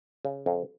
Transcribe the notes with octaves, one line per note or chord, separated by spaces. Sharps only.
C#3
F2